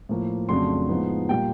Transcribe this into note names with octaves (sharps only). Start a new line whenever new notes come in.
A2 F3 A#3
F2 C#3 F#3 A3 D4 C6
A2 F3 G#3 B3 D#4
A#2 G3 A#3 G5